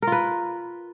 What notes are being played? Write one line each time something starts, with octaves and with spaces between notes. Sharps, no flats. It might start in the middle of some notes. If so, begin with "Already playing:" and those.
F4 A#4 B4